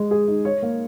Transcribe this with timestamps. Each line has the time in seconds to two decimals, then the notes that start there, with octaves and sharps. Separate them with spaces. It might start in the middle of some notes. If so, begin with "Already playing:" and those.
Already playing: G#3 D#5
0.11 G#4
0.28 D#4
0.45 C#5
0.62 A#3